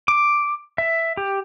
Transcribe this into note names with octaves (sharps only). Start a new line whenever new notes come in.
D6
E5
G4